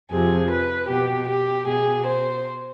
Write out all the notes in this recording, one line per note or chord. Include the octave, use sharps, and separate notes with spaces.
F2 C3 F3 G#4
B4
B2 G4
G4
B2 G#4
C5